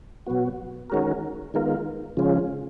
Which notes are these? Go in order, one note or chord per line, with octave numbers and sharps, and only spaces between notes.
B2 F#3 B3 F#4
D#3 G#3 C#4 F#4 A#4
D#3 G#3 B3 F4 A#4
C#3 F3 G#3 C#4 F4